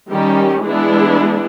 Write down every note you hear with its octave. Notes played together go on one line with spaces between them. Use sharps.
D#3 G3 C#4 G4
E3 G#3 B3 D4 E4 G#4